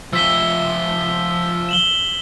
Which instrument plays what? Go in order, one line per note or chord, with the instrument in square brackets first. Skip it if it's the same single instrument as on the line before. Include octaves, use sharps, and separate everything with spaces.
[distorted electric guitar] F3 E5 [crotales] E6 B6 G7
[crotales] E7 F#7 G7